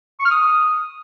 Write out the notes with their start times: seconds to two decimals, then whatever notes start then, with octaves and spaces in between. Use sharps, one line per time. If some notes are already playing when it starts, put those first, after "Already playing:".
0.20 C#6
0.25 F6
0.31 D#6